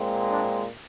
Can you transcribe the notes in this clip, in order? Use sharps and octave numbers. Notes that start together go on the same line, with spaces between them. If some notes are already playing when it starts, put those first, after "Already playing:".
Already playing: A#2 G#3 C4
D4